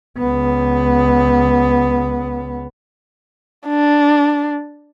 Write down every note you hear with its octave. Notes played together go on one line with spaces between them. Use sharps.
C#2 B3
D4